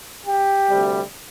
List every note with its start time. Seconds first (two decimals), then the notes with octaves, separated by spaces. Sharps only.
0.25 G4
0.69 D2 C3 G3